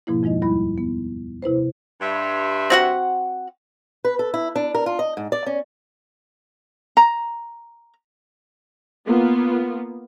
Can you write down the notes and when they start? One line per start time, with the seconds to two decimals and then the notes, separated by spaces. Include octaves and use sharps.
0.07 G#2 B2 F3 A#3 E4
0.23 F2 F3 G#3 D#4 D#5
0.42 D#2 G3 E4 B5
0.78 B3
1.42 C3 E4 B4 C5
2.01 G2 E5 C6
2.70 C4 F#4 F#5
4.05 B4
4.19 A4
4.34 E4
4.56 D4
4.75 A#4
4.86 F4
4.99 D#5
5.17 G#2
5.32 D5
5.46 C#4
6.97 A#5
9.06 A#3 B3 F4